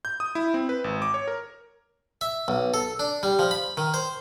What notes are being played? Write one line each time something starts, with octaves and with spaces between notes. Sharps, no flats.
G6
D#6
E4
C4
B4
G#1
D6
C#5
A#4
E5
B1
A4
D4
G3
F3
B5
D#3
C5